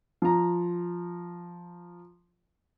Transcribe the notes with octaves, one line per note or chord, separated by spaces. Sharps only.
F3 A#5